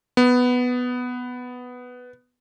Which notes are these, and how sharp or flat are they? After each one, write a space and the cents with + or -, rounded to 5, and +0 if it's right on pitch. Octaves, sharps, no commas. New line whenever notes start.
B3 +5